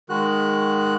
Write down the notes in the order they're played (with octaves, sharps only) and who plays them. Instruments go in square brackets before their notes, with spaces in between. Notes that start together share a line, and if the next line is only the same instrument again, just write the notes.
[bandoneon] D#3 G#3 F#4 F#6